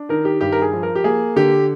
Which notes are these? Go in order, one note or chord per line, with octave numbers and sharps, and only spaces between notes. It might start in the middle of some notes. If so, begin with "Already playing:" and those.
Already playing: D4
D#3 A#4
G4
G2 G4
A#4
G#4
F3
A#4
G4
A#3 G#4
D3 G4